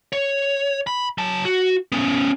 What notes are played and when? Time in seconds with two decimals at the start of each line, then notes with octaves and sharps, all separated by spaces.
0.13 C#5
0.87 B5
1.18 F#3 A5
1.45 F#4
1.92 B3 C#4